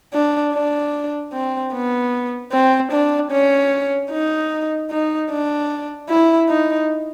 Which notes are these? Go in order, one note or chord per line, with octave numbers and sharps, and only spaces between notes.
D4
D4
C4
B3
C4
D4
C#4
D#4
D#4
D4
E4
D#4